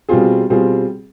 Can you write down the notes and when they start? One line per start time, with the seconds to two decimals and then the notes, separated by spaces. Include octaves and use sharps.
0.09 B2 G3 C4 F4 G#4
0.50 B2 G3 C4 F4 G#4